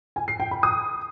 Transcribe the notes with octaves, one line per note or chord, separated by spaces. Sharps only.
G#5
C7
G5
B5
D#6